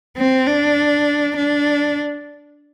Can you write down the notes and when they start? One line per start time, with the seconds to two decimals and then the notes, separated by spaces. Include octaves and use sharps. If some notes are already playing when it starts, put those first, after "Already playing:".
0.17 C4
0.47 D4
1.36 D4